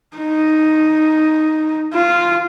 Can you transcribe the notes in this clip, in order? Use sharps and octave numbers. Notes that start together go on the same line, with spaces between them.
D#4
F4